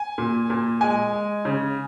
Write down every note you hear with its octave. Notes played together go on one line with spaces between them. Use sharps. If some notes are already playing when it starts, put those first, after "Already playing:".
Already playing: G#5
A#2
A#2
G#3 G#5
G#3
C#3